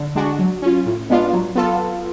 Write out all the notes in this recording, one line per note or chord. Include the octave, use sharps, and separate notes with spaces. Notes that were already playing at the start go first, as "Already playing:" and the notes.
Already playing: D3
G#3 D4 F#4
F#3
C#4 F4
A2
G#3 B3 D4 F4
F#3
B3 F4 A4